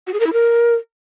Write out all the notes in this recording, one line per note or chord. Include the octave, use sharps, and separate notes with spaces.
F#4
G#4
A#4
E4
A#4